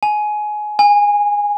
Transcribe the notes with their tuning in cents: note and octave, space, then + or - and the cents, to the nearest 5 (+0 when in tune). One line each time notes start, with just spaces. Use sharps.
G#5 +20
G#5 -15